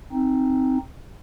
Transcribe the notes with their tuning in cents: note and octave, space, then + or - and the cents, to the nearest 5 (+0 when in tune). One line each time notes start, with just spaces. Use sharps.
C4 +0 D#4 +0